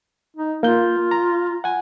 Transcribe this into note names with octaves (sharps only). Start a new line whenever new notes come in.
D#4
A#3 F4 G6
A#5
F#5 G#5